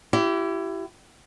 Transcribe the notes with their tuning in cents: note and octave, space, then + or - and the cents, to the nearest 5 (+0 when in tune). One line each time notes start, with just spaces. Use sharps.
E4 +25 G4 -25